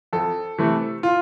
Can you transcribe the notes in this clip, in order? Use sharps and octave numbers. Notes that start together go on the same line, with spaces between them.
F2 A4
C3 E3 A3
F4